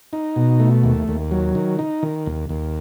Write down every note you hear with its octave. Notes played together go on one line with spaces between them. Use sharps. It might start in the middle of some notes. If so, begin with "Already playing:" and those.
D#4
B2
A3
D#2
D#2
F#3
D#3
D#4
D#3
D#2
D#2